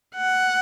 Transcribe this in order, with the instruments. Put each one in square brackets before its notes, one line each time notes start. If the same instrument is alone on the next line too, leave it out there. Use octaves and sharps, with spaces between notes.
[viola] F#5